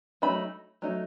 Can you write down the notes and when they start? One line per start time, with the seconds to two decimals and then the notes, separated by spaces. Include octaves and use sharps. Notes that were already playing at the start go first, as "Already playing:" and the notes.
0.22 F#3 A3 D#4 B5
0.82 F#3 A3 D#4